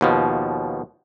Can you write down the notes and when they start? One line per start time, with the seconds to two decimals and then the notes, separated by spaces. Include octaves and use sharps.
0.01 D#2 B2 F3